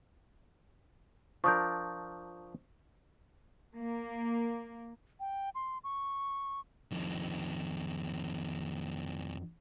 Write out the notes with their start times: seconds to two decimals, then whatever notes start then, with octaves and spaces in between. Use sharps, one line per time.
1.44 F3 D4 A#4 C#6 D#6 G6
3.79 A#3
5.20 G5
5.55 C6
5.84 C#6
6.92 F2 D#3